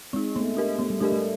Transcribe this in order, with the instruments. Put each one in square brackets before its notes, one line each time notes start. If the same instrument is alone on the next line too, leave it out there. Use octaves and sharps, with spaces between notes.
[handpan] G#3 [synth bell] C4 D#4
[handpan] A3 [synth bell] B3
[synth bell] D4 G4 A#4 D#5
[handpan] A3 [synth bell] B3
[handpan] G3
[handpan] A3 [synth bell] D4 G4 A#4 D#5
[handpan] A3